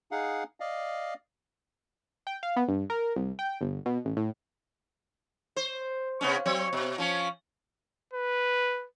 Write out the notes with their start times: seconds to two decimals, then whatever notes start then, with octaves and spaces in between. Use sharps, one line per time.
0.11 D#4 G#4 F5 F#5
0.60 D5 D#5 F5
2.27 G5
2.43 F5
2.56 B3
2.68 G2
2.90 A#4
3.16 C2
3.39 G5
3.61 G1
3.86 B2
4.05 A1
4.17 A2
5.56 C5
6.21 C3 B3 C#4
6.46 F#3 C4 C#5
6.73 B2
6.98 F3 C#4
8.13 B4